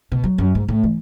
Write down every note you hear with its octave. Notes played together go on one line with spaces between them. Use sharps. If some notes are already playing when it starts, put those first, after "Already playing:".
B2
F#3
F#2
G#2
A2
E3